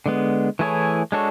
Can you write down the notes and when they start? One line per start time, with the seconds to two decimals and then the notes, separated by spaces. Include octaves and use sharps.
0.06 D3 G#3 B3
0.59 E3 A3 E4 G#4 C#5
1.12 G#3 D4 F#4 A4 C#5